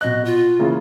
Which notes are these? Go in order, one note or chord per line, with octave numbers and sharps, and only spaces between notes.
B2 D#5 F#6
F4
C#3 E3 A#3